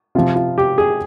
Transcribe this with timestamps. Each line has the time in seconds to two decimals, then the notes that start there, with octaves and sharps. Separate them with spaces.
0.15 C3 F3 F4
0.36 F4
0.58 G4
0.78 G#4